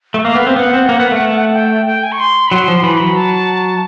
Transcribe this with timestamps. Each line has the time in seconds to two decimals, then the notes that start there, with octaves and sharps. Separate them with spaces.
0.14 A3
0.24 A#3 F5
0.35 B3
0.47 C4
0.56 B3 F#5
0.74 C4
0.89 A#3
1.00 B3
1.11 A3
1.53 G5
1.86 G5
2.03 G#5
2.12 C#6
2.19 C6
2.47 B5
2.51 F#3 C6
2.68 F3
2.83 E3 B5
3.00 F#3
3.16 A5